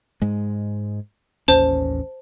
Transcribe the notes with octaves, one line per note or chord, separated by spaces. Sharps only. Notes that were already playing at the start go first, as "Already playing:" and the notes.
G#2 G#3
A1 D#2 C#4 C5 A5